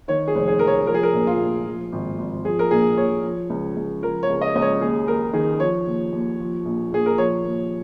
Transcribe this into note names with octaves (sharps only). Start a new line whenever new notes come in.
D#3 C#5
G#4
F1
G#4
F1 A#4
C#5
F3 A#4
G#4
A#4
A#1
F4
A#1
F3
G#1
G#1
F3 G#4
A#4
A#1 G#4
A#1 C#5
F3
C#2
C#2
F3 A#4
C#5
C#2
D#5
C#2 D#5
C#5
D#2 G#4
D#2 A#4
D#3 G#4
F3 C#5
D#2
D#2
F3
A#1
A#1 G#4
A#4
F3 C#5
D#2